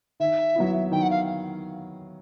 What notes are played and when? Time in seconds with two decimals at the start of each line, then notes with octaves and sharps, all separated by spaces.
0.20 D#3 E5
0.56 F#3 B3 E4
0.91 D#3 G5
1.02 F#5
1.11 F5